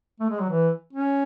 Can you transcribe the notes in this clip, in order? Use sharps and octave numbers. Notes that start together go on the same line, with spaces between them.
A3
G#3
F#3
E3
C#4